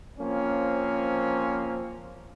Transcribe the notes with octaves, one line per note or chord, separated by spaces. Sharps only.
F3 A#3 C4 C#4